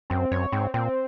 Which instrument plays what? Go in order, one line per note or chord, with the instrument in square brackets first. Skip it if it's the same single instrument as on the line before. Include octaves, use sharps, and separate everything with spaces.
[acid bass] F#2 [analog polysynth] C4
[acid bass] F#2 [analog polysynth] C#5
[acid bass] G#2 [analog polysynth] C4
[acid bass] A#2 [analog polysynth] C4